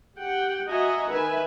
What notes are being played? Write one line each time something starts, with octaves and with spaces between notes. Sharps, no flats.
G4 F#5 G5
F#4 D#5 E5 F#5 G#5 A#5
D#3 B4 E5 G#5